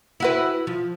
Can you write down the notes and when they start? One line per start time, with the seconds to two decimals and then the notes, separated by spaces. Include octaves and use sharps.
0.20 E4 F#4 B4
0.67 F3